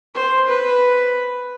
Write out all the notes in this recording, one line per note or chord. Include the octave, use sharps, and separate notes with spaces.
C5
B4